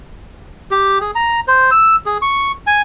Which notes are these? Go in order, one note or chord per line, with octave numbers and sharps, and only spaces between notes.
G4
G#4
A#5
C5
E6
G#4
C#6
G#5